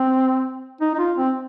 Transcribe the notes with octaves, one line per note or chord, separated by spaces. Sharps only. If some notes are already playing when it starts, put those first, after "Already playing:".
Already playing: C4
D#4
D#4
F4
C4